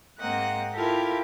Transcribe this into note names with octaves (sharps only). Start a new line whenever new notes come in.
G#2 A#3 C4 D#5 F#5 F#6
E4 F4 G4 A4 A#4 F5